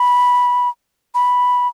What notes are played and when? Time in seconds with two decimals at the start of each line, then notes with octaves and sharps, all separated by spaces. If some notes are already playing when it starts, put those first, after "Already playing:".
Already playing: B5
1.14 B5